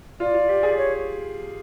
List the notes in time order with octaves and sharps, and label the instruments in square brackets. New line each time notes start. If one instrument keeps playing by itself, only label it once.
[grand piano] F4 [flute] D5
[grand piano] F4
G4
G#4
[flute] C#5